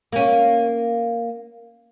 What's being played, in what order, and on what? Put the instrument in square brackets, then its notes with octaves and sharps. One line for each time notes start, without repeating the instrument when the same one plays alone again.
[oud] A#3 C#4